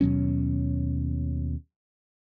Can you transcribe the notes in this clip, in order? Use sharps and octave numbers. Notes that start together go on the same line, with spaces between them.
D#2 B2 F#3 C#4